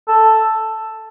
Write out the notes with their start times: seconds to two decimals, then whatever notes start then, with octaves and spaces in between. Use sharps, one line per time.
0.08 A4